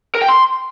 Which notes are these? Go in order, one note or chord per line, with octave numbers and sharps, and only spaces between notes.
A#4
G5
C6